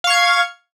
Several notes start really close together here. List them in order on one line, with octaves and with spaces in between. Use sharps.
F5 C#6 G#6